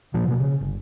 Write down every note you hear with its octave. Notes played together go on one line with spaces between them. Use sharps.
A#2 F3 A#3
B2 A#3
C#3
G1